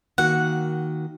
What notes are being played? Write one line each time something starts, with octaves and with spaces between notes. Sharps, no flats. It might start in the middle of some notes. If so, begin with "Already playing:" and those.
D#3 A#3 F#4 F#5